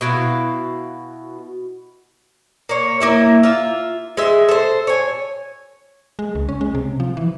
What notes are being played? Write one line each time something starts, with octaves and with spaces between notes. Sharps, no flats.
B2 E4 F#4 F5
A#3 C#5
A#3 E4 E5
F4 E5
G#3 E5
A4 C5
C#5 G#5
G#3
C#2
C#4
G#3
C3
F3
E3